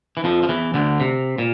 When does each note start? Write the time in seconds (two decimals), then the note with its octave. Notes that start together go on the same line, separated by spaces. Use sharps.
0.17 E3
0.24 F2 F3
0.43 F3
0.49 E2 E3
0.74 D2 D3
1.00 C3
1.38 A#2